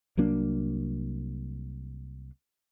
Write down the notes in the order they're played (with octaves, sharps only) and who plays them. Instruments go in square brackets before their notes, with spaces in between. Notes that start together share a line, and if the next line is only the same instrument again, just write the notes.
[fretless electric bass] C2 F#3 A#3 D4